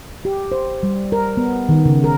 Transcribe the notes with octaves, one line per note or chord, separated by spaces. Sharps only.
G4
C5
G3
A#4
B3
D#3
C#3
A#4